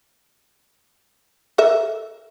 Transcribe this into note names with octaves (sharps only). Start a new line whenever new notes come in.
A4 A#4 E5